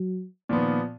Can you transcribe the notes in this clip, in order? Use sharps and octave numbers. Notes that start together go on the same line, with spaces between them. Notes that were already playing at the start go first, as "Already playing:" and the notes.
Already playing: F#3
A#2 D#3 F3 B3